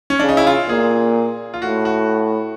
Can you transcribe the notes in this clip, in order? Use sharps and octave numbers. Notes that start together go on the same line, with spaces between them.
C#4
C#3 D4
D#4
E4
F4
A#2 G#4
F4
A2 F#4
F#4